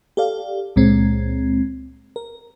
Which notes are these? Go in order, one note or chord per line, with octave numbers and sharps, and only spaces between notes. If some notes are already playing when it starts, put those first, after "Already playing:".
G4 A4 D5 F5
C#2 A#2 G#3 C4
A#4